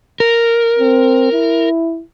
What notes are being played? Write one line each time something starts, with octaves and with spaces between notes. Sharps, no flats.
A#4
C4
E4